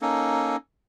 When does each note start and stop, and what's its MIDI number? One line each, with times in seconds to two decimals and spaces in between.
0.02 0.56 58
0.02 0.56 61
0.02 0.56 63
0.02 0.56 69